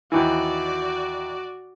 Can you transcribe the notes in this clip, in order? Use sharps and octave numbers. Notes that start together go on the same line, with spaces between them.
D#2 E3 F#4 D5